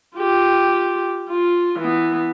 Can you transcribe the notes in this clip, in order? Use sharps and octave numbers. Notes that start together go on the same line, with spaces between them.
F4 G4
F4
E3 B3